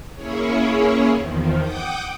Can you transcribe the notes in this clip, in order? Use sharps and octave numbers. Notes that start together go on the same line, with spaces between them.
A#3 C#4 E4 G#4 C#5
E2 D#3 F3
F#5 G5 D6 D#6 G6